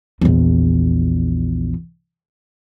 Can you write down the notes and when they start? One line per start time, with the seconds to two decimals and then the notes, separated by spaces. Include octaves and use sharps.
0.21 A#1 E2